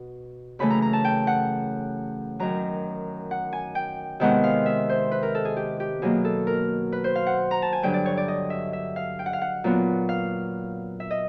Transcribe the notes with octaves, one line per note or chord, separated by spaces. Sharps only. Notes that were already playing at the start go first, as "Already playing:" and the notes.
Already playing: B2
F#2 C#3 E3 A3 B5
A#5
A#5
A5
G5
F#5
F#2 D#3 F#3 A#5
F#5
G#5
G5
C3 D#3 G#3 B3 F#5
F5
E5
C5
B4
A#4
A4
G#4
G4
G4
B2 F#3 A#3 G#4
A4
A#4
B4
C5
F5
F#5
A#5
A5
G#5
G2 D3 F#3 G5
D5
C#5
D5
D#5
E5
E5
F5
G5
F#5
F5
F#5
A#2 F#3 B3
F5
E5
D#5